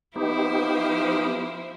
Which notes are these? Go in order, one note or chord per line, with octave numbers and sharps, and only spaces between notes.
F3 B3 D#4 E4 G4 C5